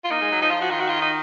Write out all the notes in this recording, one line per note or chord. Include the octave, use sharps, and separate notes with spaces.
F4
A#3 D#4
G#3
F#3
F3 D#4
F4
F#4
D#3 F4
F#4
F4
D#4